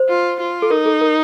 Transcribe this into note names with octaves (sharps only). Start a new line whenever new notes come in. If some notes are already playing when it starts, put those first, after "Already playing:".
Already playing: C5
F4
F4
A4
D#4 A#4
A4
A#4